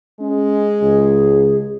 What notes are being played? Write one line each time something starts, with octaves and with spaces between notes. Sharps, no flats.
G#3 C#4
C#2 G#4